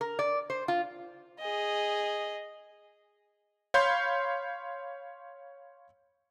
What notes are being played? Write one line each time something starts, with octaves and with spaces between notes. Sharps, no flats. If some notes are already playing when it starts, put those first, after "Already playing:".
A#4
D5
C5
F4
G#4 D#5
C#5 F5 B5 C6 G6